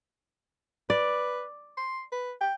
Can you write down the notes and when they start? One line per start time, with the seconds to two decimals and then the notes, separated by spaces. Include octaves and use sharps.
0.90 B4 D5
1.78 C6
2.12 B4
2.41 G5